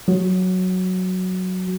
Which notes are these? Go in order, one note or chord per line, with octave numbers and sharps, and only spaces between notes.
F#3 F#4